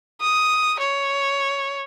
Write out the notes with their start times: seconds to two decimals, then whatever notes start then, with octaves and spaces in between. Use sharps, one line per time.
0.21 D#6
0.80 C#5